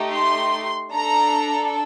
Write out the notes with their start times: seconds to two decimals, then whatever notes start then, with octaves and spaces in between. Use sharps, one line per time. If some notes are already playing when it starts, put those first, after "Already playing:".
Already playing: A3 D#4 G4
0.12 C6
0.93 D4 A4 A#5